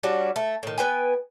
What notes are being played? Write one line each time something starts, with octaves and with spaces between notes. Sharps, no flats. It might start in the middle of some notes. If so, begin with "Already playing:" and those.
G3 C#4 D4 F#4
A3
A2 D#3
B3 B4 G5 G#5